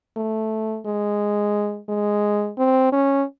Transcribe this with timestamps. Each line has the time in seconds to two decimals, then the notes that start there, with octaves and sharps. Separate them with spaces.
0.17 A3
0.86 G#3
1.89 G#3
2.58 C4
2.92 C#4